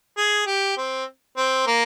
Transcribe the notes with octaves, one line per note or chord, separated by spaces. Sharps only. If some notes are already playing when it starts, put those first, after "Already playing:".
G#4
G4
C4
C4
A#3